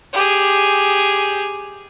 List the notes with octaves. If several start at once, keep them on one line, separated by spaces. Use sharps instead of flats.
G4 G#4